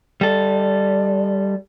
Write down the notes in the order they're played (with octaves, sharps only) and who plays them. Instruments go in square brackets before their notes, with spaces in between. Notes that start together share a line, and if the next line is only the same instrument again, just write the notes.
[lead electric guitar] G3 A4 [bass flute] D5